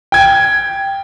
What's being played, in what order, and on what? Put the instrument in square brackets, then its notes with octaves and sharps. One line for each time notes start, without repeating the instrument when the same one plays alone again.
[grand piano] G5 G#6